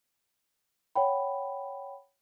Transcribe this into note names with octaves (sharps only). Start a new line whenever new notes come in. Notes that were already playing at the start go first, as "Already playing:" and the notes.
C#5 F#5 G5 B5